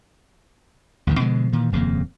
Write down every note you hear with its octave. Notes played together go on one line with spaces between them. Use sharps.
A1 D2 D3 D#3
B2 D3 F3 G#3
A#2 D#3 E3
D#1 F2 C#3 A#3